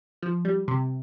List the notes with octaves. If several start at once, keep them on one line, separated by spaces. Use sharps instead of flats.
F3
G3
C3